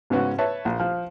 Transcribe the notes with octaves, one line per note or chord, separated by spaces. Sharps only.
G#2 C#3 B3 C#4 F#4
B4 C#5 E5 A5
A#1
F3